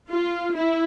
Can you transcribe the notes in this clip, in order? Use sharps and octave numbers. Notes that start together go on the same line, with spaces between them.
F4
E4